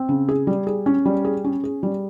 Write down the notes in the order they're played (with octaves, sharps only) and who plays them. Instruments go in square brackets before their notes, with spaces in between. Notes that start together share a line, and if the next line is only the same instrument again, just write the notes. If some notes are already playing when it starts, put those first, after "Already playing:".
Already playing: [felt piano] C4
C#3
G#4
G3
G#4
C#4
G3
G#4
C#4
G#4
G3